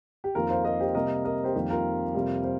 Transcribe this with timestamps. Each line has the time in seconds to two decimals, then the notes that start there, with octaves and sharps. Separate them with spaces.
0.24 G4
0.35 F2 D#3 A#3 F4 A#4
0.50 C5 F5
0.65 A#4 D#5
0.80 G4 C5
0.94 C3 G3 A#3 A#4 D#5
1.24 A#4 D#5
1.44 G4 C5
1.55 F2 D#3 G3 A#3 G4
1.70 F4 A#4
2.14 F2 C3 G3 A#3
2.44 C5